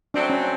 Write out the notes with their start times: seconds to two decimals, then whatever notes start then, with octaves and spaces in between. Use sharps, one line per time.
0.14 F#3 A3 C4 D4
0.30 C#4